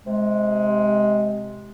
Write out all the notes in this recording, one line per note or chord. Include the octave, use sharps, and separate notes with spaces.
C3 G#3